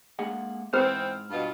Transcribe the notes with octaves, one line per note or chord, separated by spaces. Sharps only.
G#3 A#3 G#4 F#5
G#2 E3 B3 C4 C5 F6
G2 B2 F4